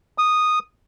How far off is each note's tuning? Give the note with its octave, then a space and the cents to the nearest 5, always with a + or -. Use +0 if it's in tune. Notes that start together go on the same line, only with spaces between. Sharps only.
D#6 -10